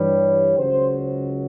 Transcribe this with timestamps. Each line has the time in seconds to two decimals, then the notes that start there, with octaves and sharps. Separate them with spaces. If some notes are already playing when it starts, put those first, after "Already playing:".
Already playing: G2 E3 G3 C#5
0.58 C#2 C#3 F#3 C5
0.92 C5